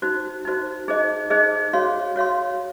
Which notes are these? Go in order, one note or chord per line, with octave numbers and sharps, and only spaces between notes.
D#4 F#4 C5
D#4 F#4 C5
D#4 G#4 C5 D#5
D#4 G#4 C5 D#5
F#4 C#5 F5 C6
F#4 C#5 F5 C6